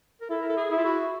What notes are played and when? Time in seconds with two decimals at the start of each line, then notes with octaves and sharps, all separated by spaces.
0.21 A#4
0.30 E4 A4
0.41 A#4
0.49 A4
0.57 G#4
0.71 E4
0.77 F4
0.85 F#4